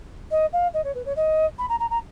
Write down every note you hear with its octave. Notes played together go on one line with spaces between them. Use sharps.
D#5
F5
D#5
C#5
B4
C#5
D#5
B5
A#5
A#5
A#5